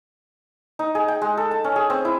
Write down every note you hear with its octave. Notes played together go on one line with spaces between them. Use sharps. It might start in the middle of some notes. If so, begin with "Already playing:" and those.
D#4
G#4
G5
G#3
A4
A5
C#4
G#4
C4
E4